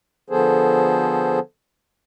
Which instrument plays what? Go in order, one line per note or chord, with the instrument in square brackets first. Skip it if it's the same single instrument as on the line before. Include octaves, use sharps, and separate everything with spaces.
[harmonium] D3 F3 B3 G#4 A4 C5